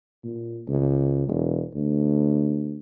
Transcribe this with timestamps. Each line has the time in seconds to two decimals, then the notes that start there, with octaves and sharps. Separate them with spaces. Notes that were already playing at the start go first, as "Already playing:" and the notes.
0.24 A#2
0.68 C#2
1.28 E1
1.75 D2